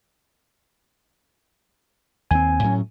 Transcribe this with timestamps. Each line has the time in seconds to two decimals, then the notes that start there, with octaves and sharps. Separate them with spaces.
2.31 D#2 C4 G#5
2.63 A2 F#3 C#4